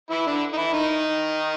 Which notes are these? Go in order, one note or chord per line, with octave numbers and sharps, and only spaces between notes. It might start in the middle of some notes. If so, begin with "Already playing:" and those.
E3 E4
D3 D4
D#4
E3 E4
D#3 D#4